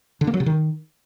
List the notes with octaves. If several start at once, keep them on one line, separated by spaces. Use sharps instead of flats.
D3
A#3
F#3
C3
D#3